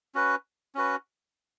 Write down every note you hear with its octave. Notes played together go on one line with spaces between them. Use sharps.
C#4 F#4 B4
C#4 F#4 B4